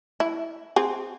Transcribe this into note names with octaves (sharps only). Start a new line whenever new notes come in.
E4
C4 G#4